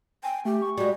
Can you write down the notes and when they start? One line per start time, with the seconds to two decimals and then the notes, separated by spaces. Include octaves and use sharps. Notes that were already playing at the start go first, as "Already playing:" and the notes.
0.24 G5 G#5
0.45 A3 G4
0.62 C#6
0.78 G3 G#3 F#4